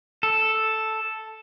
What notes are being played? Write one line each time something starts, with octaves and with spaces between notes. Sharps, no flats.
A4